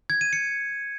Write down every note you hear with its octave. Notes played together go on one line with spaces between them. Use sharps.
G#6
D#7
C#7